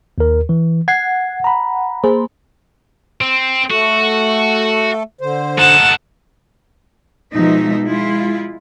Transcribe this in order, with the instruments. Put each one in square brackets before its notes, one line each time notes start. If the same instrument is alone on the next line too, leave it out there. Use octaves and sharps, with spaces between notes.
[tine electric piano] D#2 A#4
E3
[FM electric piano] F#5 [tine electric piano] G#6 C7
[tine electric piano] A#5 B5
[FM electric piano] A#3 G#4 C5
[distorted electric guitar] C4
[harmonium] A3 A4 [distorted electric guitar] F#4
[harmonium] D3 C5
[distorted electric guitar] A3 D#4 [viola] F#5 A5
[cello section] B2 F3 G#3 D#4 E5
G#3 E4 F4